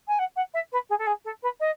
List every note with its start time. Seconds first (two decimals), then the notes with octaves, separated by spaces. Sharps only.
0.08 G#5
0.19 F#5
0.36 F#5
0.54 E5
0.72 B4
0.89 G#4
0.99 A4
1.07 G#4
1.25 A4
1.43 B4
1.60 D#5